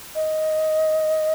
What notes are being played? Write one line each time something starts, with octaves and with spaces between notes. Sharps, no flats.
D#5